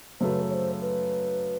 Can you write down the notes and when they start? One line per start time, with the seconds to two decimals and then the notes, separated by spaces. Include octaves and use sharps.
0.20 F#2 C#3 F#3 A3 B4 C5
0.50 C#5
0.54 C5
0.82 B4